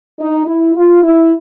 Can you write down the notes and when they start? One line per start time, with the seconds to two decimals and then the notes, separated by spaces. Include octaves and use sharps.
0.19 D#4
0.46 E4
0.75 F4
1.03 E4